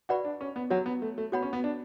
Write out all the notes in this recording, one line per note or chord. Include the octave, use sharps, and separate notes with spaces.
F#4 B4 D5 F#5 B5
D4
C#4
B3
F#3 F#4 C#5 F#5
B3
A3
A3
B3 F#4 C#5 F#5 B5
C#4
B3
D4